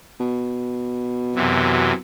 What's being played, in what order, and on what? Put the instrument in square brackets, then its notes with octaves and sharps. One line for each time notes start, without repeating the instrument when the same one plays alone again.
[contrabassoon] B2
[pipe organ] F#2 C3 E3